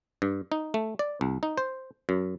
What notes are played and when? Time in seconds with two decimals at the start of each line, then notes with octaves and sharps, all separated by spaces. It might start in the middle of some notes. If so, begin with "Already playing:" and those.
0.22 G2
0.52 D#4
0.74 A3
0.99 D5
1.21 C2
1.43 D#4
1.58 C5
2.09 F#2